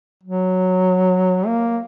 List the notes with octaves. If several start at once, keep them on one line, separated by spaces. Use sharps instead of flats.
F#3
A#3